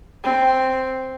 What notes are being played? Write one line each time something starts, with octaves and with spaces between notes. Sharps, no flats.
C4